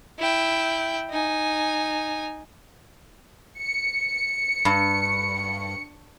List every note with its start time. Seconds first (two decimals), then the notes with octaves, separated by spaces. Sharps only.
0.19 E4 G5
1.10 D#4 G#5
3.58 C#7
4.65 G2